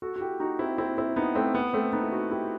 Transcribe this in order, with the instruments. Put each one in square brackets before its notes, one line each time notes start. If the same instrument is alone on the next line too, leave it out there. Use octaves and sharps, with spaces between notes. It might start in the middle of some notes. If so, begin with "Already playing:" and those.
[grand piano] F#4 A4
F#4
E4 G4
D#4 F#4
C4 E4
C4 E4
C4 E4
B3 D#4
A3 C4
B3
A3 C4
B3 D#4
E4
D#4 F#4
E4 G4